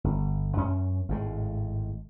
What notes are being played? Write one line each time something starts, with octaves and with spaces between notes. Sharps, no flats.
G1
F#2 C#4
G#1 A2 G#3